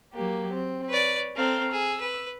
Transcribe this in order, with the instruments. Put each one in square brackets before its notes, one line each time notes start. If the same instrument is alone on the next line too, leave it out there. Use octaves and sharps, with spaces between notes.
[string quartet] F#3 A#3 G4
C4
[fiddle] B4 D5 [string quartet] C#5
[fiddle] C4 A4 [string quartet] F5 A#5 C6
[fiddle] G#4 [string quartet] E6
[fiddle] B4